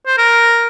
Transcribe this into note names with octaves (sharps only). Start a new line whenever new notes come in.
C5
A#4